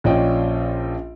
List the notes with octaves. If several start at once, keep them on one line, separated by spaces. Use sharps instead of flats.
A#1 C#4 F4 D5 D#5 G5